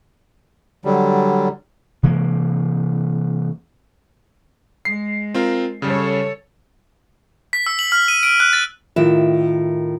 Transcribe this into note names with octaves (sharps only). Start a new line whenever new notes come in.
D3 F#3 G3
C3 E3 G#3 A#3
G#3 C7
C4 F4 A#4
C#3 G3 A4 C#5
B6
E6
F#7
F6
D#7
D7
F#6
A6
A2 D#3 E4 F4 E5